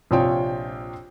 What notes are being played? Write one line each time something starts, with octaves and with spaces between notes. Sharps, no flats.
A#1 C3 F4 C#5 G5